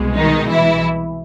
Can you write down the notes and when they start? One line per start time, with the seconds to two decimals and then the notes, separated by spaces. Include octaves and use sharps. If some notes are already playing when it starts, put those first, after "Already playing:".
Already playing: C2 B2 G#3
0.16 D#3 D#4
0.48 E3 E4